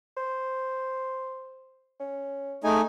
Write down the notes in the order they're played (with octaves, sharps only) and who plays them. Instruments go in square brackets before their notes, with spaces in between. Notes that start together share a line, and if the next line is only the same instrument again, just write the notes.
[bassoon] C5
C#4
[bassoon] G#3 [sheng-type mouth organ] A3 D#4 G#5